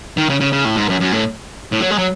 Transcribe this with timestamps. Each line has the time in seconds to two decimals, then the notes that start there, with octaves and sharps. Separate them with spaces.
0.17 D#3
0.30 C#3
0.40 C#3
0.52 C#3
0.65 A2
0.76 G#2
0.89 F#2
1.00 F#2
1.12 A2
1.72 A2
1.81 F#3
1.91 G#3
1.98 F#3